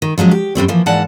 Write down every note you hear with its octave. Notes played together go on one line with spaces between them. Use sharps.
D#3
F3 F#3 G#3 C#4
G4
F#2 G3 C4 C#5
E3 F3 A#3
G#2 E3 A#3 D5 F#5 A5